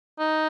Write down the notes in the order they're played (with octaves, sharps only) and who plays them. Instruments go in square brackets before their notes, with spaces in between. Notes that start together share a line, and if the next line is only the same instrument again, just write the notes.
[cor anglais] D#4